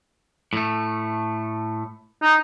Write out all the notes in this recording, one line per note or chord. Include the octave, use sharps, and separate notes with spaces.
A2 A3
D#4